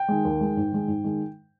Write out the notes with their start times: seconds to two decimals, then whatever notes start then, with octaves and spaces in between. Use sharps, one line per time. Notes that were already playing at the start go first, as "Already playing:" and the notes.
Already playing: G5
0.08 D#3 G#3
0.25 D#2
0.41 D#3 G#3
0.57 G#2
0.72 D#3 G#3
0.88 G#2
1.04 D#3 G#3